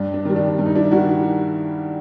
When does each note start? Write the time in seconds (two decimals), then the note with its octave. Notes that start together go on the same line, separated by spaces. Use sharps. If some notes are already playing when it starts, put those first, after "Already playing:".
Already playing: G2 D4
0.13 D4
0.25 D#3 G3
0.36 D4
0.58 G2
0.66 D#4
0.75 D4 E4
0.91 D#3 G3 E4 F#4